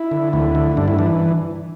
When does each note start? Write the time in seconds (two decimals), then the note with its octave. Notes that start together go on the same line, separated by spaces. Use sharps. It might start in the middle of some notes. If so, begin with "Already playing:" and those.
Already playing: E4
0.11 D3
0.33 D2 E4
0.55 D3
0.77 G2 D4
0.88 E4
0.99 E3 D4